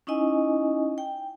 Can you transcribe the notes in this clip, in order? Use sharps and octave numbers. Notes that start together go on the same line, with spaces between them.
C#4 D#4 E4 D#5 G#5
G5